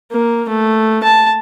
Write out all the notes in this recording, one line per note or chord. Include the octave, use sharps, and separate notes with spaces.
A#3
A3
A5